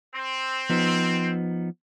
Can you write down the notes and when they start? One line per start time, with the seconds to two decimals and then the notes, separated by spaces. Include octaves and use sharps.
0.15 C4
0.70 F3 B3 D#4